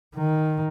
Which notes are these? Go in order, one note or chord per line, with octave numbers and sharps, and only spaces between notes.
D#3